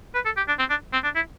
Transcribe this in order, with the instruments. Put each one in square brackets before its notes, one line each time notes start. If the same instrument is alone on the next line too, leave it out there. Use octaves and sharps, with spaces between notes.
[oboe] B4
A4
G4
D4
C4
D4
C4
D4
E4